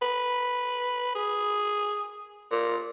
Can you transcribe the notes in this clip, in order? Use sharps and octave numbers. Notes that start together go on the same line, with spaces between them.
B4
G#4
A#2